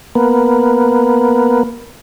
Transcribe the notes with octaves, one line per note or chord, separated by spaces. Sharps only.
A#3 B3